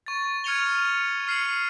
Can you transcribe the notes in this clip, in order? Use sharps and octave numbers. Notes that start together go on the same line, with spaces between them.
C#6 A6
F6 G#6 C#7 D#7 F7 G7
F6 C7 C#7 D#7 F#7